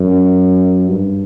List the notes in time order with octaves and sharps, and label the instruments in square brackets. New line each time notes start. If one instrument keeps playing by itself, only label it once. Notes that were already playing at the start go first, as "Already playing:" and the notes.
Already playing: [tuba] F#2
G2